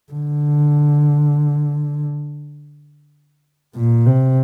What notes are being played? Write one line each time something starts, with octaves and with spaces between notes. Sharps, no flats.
D3
A#2
C3